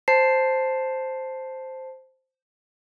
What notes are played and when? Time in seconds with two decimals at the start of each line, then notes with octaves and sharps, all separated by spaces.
0.08 C5 A5 C7